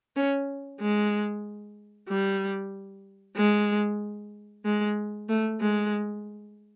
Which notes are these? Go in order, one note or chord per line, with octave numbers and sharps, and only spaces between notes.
C#4
G#3
G3
G#3
G#3
A3
G#3